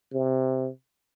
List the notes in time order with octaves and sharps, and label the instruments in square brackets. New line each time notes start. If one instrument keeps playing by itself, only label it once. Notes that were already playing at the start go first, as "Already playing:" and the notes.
[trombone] C3